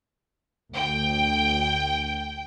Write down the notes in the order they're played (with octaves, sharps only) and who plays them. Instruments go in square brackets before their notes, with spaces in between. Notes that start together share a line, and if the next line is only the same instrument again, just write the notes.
[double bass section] D2 [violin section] G5